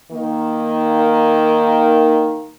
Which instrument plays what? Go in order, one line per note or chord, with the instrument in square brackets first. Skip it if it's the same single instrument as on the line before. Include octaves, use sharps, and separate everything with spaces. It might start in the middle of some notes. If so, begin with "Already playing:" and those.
[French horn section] D#3 A#3